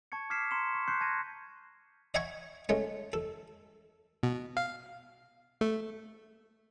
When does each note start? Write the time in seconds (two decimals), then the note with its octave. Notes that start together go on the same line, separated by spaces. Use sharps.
0.12 A5 C#6 G#6 C#7
0.30 D6 F6 G#6 B6 C7 E7
0.51 A#5 C6 C#7 E7
0.74 C#6
0.88 C6 C#6 F#6 G6 C7 C#7
1.01 A5 G#6 A#6 D#7
2.14 D#5 E5 F#5 G#5 B5 C#6
2.69 G#3 A3 C#4
3.13 A4
4.23 B2
4.57 F5
5.61 A3